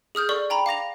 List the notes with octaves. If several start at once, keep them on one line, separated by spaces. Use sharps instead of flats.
G#4 D#6 F6 G6
A4 D5 C#6
G5 A#5 B5
F5 D6 A#6 F7